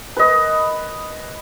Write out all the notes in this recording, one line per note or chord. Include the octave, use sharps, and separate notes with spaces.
B4 D#5